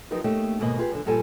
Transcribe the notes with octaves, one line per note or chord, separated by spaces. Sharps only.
F3 F#3 D#4 G4 A#4 B4
A3 A#3 C#4 D#4 G4
D#2 G#2 B2 A#3 D#5
F4 G4 G#4 B4
F#2 D3
G2 A#2 F3 G3 A4 G#5